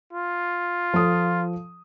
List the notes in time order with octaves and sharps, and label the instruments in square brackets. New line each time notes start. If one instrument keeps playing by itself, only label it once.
[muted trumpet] F4
[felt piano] F3 A4 D#6